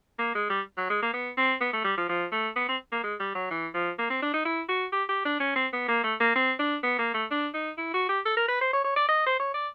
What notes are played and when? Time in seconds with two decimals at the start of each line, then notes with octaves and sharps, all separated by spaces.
0.19 A#3
0.35 G#3
0.50 G3
0.78 F#3
0.90 G#3
1.02 A#3
1.13 B3
1.37 C4
1.61 B3
1.73 A3
1.85 G3
1.97 F3
2.09 F3
2.32 A3
2.56 B3
2.68 C4
2.92 A#3
3.04 G#3
3.20 G3
3.35 F#3
3.51 E3
3.74 F3
3.99 A#3
4.10 C4
4.22 D4
4.34 D#4
4.45 E4
4.69 F#4
4.93 G4
5.09 G4
5.25 D4
5.40 C#4
5.56 C4
5.73 B3
5.88 A#3
6.04 A3
6.20 A#3
6.36 C4
6.59 D4
6.83 B3
6.99 A#3
7.14 A3
7.31 D4
7.54 D#4
7.78 E4
7.94 F#4
8.09 G4
8.26 A4
8.37 A#4
8.48 B4
8.61 C5
8.73 C#5
8.84 C#5
8.96 D5
9.08 D#5
9.26 C5
9.40 C#5
9.54 D5